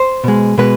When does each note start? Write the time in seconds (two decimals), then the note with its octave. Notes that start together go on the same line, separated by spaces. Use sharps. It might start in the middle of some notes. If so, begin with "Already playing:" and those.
Already playing: C5
0.24 B2 G#3
0.58 B2 G#3 B4